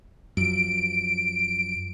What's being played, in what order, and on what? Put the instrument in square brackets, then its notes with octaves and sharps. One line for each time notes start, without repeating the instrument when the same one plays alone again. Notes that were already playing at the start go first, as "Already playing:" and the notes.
[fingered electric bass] F#2 F3 [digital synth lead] D7